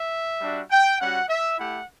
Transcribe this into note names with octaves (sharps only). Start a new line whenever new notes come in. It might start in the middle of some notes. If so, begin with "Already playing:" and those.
Already playing: E5
G3 D4 F#4
G5
G3 C#4 F#4 F#5
E5
A3 E4 G4 F#5